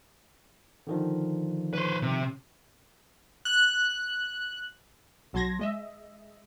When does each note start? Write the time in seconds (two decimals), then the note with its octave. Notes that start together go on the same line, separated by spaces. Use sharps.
0.87 D3 D#3 F3
1.73 B4 C5
2.02 C3
3.45 F#6
5.33 B1 F#3 A5 C6 G#6 A#6
5.59 G#3 D#5 E5